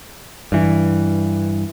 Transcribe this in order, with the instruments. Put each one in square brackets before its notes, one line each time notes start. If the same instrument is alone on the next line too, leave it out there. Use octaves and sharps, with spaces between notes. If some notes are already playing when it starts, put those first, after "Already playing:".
[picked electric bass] G2 E3